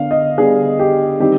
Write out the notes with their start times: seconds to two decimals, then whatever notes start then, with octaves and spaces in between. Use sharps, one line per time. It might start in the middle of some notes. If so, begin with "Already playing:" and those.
Already playing: D3 B3 D4 F5
0.11 D#5
0.38 D3 G3 B3 D4 G#4
0.79 G4
1.20 D#3 G3 C4 D#4 G4